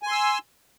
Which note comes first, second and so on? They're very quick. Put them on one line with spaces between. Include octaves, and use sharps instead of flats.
G#5 C6 E6